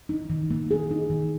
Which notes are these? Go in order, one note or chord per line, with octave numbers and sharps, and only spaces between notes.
D#4
D#3
A#3
G#4
D#4
D#3